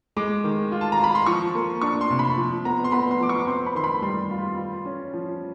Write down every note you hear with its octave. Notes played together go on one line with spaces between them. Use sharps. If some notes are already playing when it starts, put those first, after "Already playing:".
G#3 D6
D#3
F4
A5
A#5
F4 B5
C6
F3 C#6
A#3
D4 C#6
C6
C3
B5
F3
B3 A#5
C6
B3 B5
C6
F3 D6
C#6
C4 C6
B5
D#3 C6
B5
G3 C6
F4
F4
C#4
F3